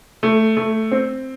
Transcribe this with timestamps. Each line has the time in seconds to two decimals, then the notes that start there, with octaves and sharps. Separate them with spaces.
0.23 A3
0.57 A3
0.91 C4